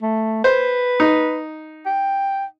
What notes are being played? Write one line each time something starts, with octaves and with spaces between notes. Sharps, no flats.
A3
B4 C5
D#4
G5